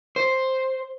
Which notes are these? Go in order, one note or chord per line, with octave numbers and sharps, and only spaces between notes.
C5